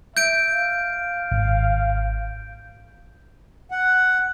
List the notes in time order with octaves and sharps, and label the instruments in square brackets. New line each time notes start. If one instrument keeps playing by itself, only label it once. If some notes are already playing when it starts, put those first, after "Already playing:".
[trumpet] E5 [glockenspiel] G6 D7
[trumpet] F5
[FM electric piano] G#1
[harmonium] F#5